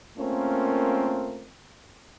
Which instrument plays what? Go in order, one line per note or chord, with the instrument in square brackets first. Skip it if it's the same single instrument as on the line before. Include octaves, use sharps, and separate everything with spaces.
[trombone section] A3 A#3 C4 C#4 F4 A#4